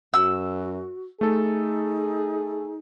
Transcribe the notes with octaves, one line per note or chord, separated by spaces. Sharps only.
F#2 F#4 E6
A3 D#4 G#4 A4